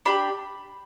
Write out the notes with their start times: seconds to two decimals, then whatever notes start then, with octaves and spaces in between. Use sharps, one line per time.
0.05 D4 G4 B5